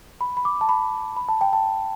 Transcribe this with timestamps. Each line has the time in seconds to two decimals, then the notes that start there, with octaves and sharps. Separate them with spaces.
0.21 B5
0.37 B5
0.45 D6
0.61 A5
0.69 B5
1.17 B5
1.29 A5
1.41 G5
1.53 A5